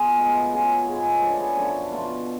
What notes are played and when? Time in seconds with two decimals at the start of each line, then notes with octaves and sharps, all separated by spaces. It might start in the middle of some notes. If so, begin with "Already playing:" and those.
Already playing: B2 F4 G#4
0.18 A2 G#3 B3
0.52 A2 F#3 C#4 F4 G#4
0.87 G#2 G#3 B3 F4 G#4 B4
1.22 F3 A3 D4 F#4 A4
1.40 G#4 B4
1.57 F#2 D3 F3 A3 A4 C#5
1.91 B2 A3 F4